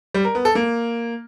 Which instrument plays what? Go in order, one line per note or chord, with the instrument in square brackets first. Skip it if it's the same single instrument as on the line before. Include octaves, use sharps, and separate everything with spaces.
[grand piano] G3
A#4
B3
A4
A#3